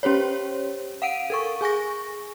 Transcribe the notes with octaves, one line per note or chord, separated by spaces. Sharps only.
C#4 G4 C5 C#5
F5 F#5 D7 D#7
A4 A#4 C#6
G#4 G#5 C#6 A#6